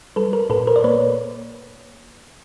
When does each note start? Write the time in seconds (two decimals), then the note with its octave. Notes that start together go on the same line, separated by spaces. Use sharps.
0.16 G3 A4 B4
0.33 A#4
0.50 A#2 A4 B4
0.67 A#4 C5
0.76 D5
0.84 A#3 B4 C#5